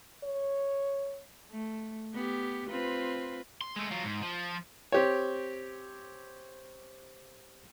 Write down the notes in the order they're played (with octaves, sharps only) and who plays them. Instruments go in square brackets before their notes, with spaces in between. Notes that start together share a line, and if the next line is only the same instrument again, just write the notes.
[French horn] C#5
[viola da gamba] A3
B3 G4
C4 F4 B4
[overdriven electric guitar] C6
G#3 A3
F#3 F4
G#2
F3
[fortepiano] C4 G4 C#5